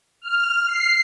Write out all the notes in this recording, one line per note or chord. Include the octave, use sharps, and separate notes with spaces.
F6
C7